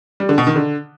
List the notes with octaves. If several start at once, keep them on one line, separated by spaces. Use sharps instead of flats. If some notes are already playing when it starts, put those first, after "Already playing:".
G3
D3
B2
D#3
D3